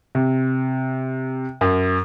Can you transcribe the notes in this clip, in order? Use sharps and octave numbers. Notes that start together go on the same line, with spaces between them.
C3
F#2